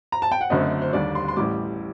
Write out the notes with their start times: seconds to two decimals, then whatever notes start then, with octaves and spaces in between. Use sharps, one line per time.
0.12 A#5
0.22 A5
0.32 G5
0.41 F#5
0.50 F#1 F#2 D3 A3 C4 D#5
0.82 C5
0.93 D#2 D3 G3 D5
1.15 C6
1.28 C6
1.36 A1 A2 G3 D6